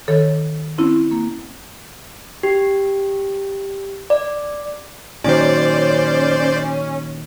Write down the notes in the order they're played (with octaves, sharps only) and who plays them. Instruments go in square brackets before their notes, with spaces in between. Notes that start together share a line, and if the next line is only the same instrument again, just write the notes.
[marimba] D#3 A4 C#5
C4 C#4 E4
A#3
[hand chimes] G4
D5
[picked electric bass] A#2 D#3 F#3 [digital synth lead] C#4 [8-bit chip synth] C5 D5